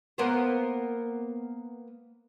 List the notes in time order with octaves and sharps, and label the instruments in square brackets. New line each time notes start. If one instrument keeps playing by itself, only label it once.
[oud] A#3 B3 C5